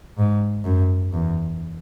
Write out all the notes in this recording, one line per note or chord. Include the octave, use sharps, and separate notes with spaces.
G#2
F#2
E2